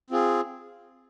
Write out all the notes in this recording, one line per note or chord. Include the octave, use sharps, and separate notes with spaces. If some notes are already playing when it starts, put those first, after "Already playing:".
C4 F4 G#4